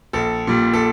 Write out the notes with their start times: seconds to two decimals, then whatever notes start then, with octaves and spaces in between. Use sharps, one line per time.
0.13 A#1 A4
0.47 A#2 G3
0.74 A4